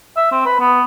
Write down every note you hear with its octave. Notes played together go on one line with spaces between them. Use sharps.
E5
C4
B4
B3